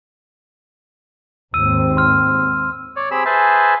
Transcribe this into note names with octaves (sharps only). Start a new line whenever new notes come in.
D#2 G#2 C4 E6 D#7
C6 F6
C#5 D5
C4 G4 G#4 B5 E6
G#4 B4 C5 E5 G#5 A5